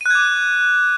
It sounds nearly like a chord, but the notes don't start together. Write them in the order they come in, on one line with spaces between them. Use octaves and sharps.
D#7 F#6 G#6 D6